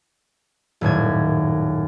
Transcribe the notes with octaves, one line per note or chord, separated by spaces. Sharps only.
D#1 F#2 A2 G#6